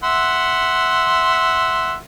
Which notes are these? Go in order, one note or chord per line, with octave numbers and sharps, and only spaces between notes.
E5 F#5 C6